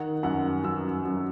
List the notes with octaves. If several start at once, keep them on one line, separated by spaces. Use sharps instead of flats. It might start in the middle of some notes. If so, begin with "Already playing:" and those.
Already playing: D#3 F#5
F#2 F#5
F#2 E6
F#2